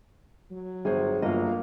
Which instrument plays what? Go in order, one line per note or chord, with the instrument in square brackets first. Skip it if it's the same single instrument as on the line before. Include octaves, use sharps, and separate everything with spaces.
[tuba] F#3
[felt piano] G1 C5 [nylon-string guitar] G#4
[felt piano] G1 [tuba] F#3 [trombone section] A#3 [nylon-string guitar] F4 D#5